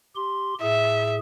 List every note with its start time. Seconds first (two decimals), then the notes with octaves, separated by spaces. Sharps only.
0.15 G4 C6
0.62 A2 G#4 E5